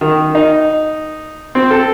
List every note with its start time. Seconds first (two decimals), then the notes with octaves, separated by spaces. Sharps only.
0.01 D#3
0.35 D#4
1.55 C4
1.71 A4